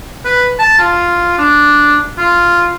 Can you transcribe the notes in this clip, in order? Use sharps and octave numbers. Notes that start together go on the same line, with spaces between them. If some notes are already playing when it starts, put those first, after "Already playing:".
B4
A5
F4
D4
F4